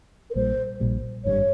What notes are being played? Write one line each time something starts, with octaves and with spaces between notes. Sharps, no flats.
A#4
A#1 A#2 G3 C5
A#1 A#2 G3
G#1 G2 G3 C#5